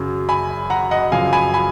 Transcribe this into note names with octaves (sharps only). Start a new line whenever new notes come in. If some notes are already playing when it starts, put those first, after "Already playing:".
Already playing: F#2 C#3 F#3
G#5 B5
F#5 A#5
D#5 F#5
F#2 C#3 F3 F5 G#5
G#5 B5
G#5 B5